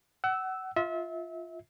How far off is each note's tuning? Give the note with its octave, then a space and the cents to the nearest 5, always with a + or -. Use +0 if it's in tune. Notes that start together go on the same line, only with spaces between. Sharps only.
F#5 +30 E6 +0
F4 +0 E5 -30